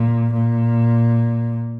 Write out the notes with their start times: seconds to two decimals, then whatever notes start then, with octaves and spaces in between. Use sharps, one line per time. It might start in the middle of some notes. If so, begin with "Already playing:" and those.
Already playing: A#2
0.33 A#2